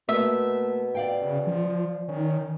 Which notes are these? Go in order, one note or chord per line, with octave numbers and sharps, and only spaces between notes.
B2 A3 A#3 E5
D5 F5 G5
C#3
F3
D#3 C#4